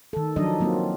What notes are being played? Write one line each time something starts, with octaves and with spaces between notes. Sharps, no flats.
D#3 A4
D#3 F3 F#3 D4 D#4 D#5
F#3 A#3 C4 F4